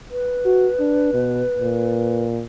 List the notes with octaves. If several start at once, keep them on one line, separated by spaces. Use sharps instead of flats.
B4
F#4
D4
B2
A#2